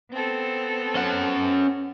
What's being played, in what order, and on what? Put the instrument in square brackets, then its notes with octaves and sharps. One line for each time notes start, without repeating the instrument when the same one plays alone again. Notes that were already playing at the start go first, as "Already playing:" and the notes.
[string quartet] B3 C4 A4
[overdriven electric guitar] C#4 F#5